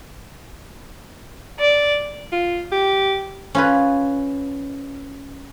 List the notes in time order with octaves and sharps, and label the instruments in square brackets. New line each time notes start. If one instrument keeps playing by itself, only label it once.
[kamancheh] D5
[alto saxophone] F4
G4
[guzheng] C#4 F4 B4